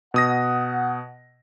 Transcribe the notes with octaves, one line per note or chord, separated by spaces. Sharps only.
B2 F#5 D#6 A#6